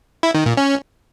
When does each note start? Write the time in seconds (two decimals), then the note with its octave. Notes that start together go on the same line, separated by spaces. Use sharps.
0.23 E4
0.35 D#3
0.46 A#2
0.57 C#4